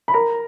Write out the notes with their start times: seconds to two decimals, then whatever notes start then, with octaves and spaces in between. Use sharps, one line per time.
0.08 B5
0.14 A#4 A#5